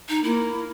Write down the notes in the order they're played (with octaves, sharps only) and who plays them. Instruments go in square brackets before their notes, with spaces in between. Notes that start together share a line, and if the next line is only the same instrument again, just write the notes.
[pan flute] D#4
[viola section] A#3 [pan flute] E4